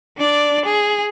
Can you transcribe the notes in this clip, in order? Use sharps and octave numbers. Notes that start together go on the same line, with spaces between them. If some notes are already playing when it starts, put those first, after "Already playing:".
D4 D5
G#4